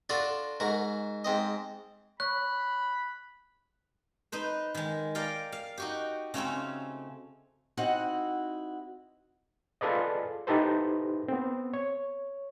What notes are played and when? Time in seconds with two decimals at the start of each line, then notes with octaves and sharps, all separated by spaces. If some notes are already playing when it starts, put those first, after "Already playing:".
0.09 D4 F4 F#4 A4 D5
0.60 G#2 F#4 A#4
1.24 G#2 C4 D#5
2.20 C#5 B5 C#6 F#6
4.32 D#4 B4 C5
4.74 D#3 G#3
5.15 A#4 D5 F5 G5
5.52 F5
5.77 D#4 F#4 G4
6.34 C#3 A3 C4 C#4
7.77 C4 D#4 E4 F#4 F#5
9.81 F4 G#4 A4 B4 D5 D#5
10.47 D#4 E4 G4 A4 B4 C5
11.28 B3 C4
11.74 C#5